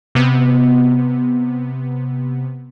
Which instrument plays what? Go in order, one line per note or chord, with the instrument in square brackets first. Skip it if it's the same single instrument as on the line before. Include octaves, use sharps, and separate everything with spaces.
[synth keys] C3 B3